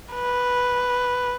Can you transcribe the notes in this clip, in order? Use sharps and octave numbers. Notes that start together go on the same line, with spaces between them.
B4